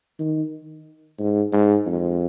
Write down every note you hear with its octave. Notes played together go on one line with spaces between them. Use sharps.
D#3
G#2
G#2
F2